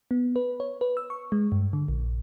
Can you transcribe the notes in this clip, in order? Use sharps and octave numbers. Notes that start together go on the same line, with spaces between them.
B3
B4
C#5
B4
E6
C#6
G#3
G2
D3
A#1